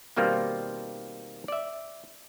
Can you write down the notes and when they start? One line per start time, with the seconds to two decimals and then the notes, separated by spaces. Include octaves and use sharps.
0.16 B2 D#3 G3 A#3 C4 F4
1.48 D5 E5